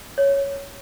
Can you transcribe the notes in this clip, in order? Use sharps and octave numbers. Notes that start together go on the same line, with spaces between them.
C#5